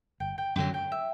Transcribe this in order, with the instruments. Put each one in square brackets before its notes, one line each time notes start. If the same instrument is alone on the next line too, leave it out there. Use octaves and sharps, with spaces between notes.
[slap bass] G1 [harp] G5
[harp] G5
[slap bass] F#2 D3 F#3 [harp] G5
[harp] G5
E5